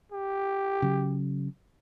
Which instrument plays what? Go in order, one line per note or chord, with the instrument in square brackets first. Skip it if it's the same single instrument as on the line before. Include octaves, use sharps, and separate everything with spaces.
[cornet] G4
[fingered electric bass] C#3 F#3